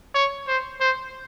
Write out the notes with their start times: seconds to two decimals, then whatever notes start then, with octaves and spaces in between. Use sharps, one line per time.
0.15 C#5
0.48 C5
0.81 C5